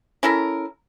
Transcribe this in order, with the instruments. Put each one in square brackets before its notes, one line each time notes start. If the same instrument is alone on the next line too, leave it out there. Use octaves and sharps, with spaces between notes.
[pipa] C#4 E4 A4 A#4